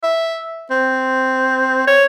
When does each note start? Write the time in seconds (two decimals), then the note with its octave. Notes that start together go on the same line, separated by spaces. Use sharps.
0.03 E5
0.71 C4
1.87 C#5